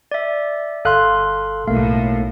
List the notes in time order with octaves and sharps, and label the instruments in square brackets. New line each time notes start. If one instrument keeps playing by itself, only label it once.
[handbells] D5 E5
[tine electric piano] G1 F5 F#6 [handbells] A4 C6
[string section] B1 A2 [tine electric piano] A3 A#3 [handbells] F5